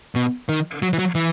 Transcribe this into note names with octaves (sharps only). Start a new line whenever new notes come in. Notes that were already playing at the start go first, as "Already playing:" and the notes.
B2
D#3
F#3
E3
F#3
E3